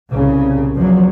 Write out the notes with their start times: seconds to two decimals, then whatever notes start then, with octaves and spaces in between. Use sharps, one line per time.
0.11 C2 A#2 C#3
0.78 E2 F3 F#3